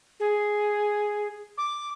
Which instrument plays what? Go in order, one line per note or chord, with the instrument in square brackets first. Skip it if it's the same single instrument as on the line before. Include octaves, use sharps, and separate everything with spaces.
[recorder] G#4
D6